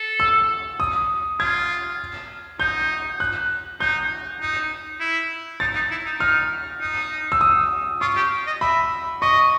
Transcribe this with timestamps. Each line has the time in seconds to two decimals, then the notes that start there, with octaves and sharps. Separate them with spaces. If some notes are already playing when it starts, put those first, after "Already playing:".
Already playing: A4
0.20 E6
0.80 D#6
1.40 F4 G#6
2.60 D#4 G6
3.20 F#6
3.80 D#4 G6
4.40 D#4
5.01 E4
5.60 D#4 A6
5.75 D#4
5.91 E4
6.06 D#4
6.20 D#4 F6
6.80 D#4
7.32 E6
7.41 D#6
8.01 F4 C#6
8.16 G4
8.47 D#5
8.61 E5 B5
9.22 D#5 C#6